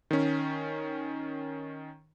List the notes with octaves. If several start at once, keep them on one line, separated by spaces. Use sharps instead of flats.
D#3 C#4